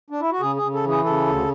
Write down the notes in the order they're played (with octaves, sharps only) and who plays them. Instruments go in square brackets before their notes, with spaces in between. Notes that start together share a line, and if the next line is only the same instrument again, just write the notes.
[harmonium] D4
E4
F#4
C#3 G#4
G#4
C#3
A4
E3
G#4
C#3 A4
D2